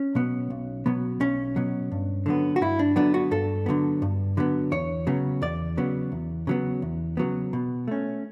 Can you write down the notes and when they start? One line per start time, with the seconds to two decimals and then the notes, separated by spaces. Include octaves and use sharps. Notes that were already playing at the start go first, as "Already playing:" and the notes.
Already playing: C#4
0.15 B2 F#3 B3
0.50 B1
0.86 B2 F#3 B3
1.20 B1 C#4
1.56 B2 F#3 B3
1.92 G2
2.26 D3 F#3 B3
2.56 F#4
2.61 G2 E4
2.79 D4
2.96 D3 F#3 B3 D4
3.14 F#4
3.31 G2 A4
3.66 D3 F#3 B3
4.02 G2
4.37 D3 F#3 B3
4.72 E2 C#5
5.07 C#3 F#3 B3
5.42 E2 D5
5.77 C#3 F#3 B3
6.12 E2
6.47 C#3 F#3 B3
6.82 E2
7.17 C#3 F#3 B3
7.53 B2
7.88 A3 C#4